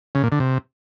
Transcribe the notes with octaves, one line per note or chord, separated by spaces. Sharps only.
C#3
A#2
D3
C3